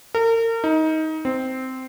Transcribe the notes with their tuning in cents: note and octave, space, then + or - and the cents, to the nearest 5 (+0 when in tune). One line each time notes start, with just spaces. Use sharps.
A#4 -35
D#4 +20
C4 -10